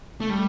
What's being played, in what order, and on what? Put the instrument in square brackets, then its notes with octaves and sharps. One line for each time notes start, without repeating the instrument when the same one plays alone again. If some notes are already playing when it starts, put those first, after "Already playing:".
[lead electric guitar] A3
G3